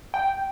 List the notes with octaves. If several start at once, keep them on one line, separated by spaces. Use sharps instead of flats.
G5